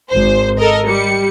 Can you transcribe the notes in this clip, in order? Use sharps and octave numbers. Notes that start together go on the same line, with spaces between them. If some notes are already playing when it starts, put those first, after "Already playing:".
G#1 C5
A4 A#4 D#5
G3 C#7